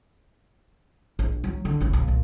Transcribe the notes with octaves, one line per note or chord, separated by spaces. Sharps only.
A#1
F#3
D3
A#1 C#4
B1
A#2